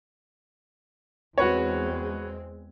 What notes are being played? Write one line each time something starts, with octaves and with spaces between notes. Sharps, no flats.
E2 G#3 C4 F#4 B4 C#5